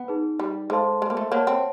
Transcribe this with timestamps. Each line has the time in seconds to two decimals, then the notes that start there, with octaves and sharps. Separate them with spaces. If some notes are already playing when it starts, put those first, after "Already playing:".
Already playing: B3
0.08 D#4 G#4 B4
0.39 G3
0.70 G#3 A4 C5 F5 A5 C6
1.02 G#3
1.10 A#3
1.17 A3
1.32 A#3 C#5 F#5 A5
1.47 C4